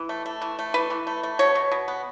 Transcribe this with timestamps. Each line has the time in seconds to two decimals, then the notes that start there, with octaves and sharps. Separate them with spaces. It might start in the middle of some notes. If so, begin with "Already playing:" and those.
Already playing: E3
0.09 A3
0.26 A3
0.42 E3
0.59 A3
0.74 E3 B4
0.90 E3
1.07 A3
1.23 A3
1.39 B2 C#5
1.55 B2
1.72 B2
1.88 B3